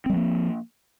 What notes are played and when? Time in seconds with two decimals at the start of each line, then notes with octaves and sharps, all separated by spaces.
0.06 C4
0.10 G3
0.13 F3
0.17 A#3